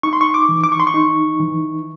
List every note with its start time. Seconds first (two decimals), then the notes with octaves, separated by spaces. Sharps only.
0.03 D#4 C#6
0.13 C6
0.21 C#6
0.34 D6
0.49 E3
0.64 D6
0.72 C#6
0.80 C6
0.87 C#6
0.94 D#4
1.40 E3